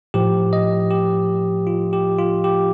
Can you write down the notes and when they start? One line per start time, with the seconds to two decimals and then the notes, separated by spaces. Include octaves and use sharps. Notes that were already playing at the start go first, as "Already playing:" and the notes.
0.14 A2 F3 G4
0.53 D#5
0.91 G4
1.67 F4
1.93 G4
2.18 F4
2.44 G4